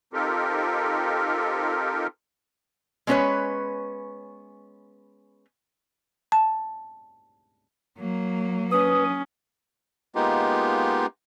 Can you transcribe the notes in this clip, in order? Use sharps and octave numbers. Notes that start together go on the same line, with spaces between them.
C4 D#4 F4 G4 A4 A#4
G#3 B3 C#4 A#4 B4 C#5
A5
F#3 A#3
C#4 B4 D#6
G#3 A#3 B3 D#4 F4 G4